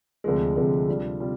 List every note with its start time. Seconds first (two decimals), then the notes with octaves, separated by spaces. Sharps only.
0.24 D2 C3 F3 G#3
0.56 D2 C3 F3 G#3
0.88 C3 G3 D4 F4
1.20 C3 G3 D4 F4